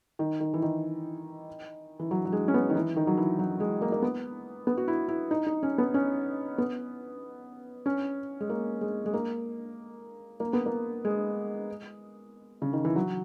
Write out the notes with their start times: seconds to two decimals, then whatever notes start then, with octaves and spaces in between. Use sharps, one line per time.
0.19 D#3
0.40 D#3
0.54 E3
0.62 D#3
2.00 E3
2.11 F#3
2.25 F#3
2.32 G#3
2.48 C#4
2.54 B3
2.70 D#3
2.75 E3
2.96 D#3
3.07 F#3
3.17 E3
3.39 F#3
3.60 G#3
3.82 A#3
3.92 A#3
4.02 B3
4.67 B3
4.77 F#4
4.88 E4
5.08 E4
5.31 D#4
5.47 D#4
5.63 C#4
5.78 B3
5.94 C#4
6.58 B3
7.86 C#4
8.40 G#3
8.50 A#3
8.81 G#3
9.06 G#3
9.14 A#3
10.40 A#3
10.53 B3
10.66 A#3
11.05 G#3
12.62 C#3
12.73 D#3
12.85 E3
12.96 F#3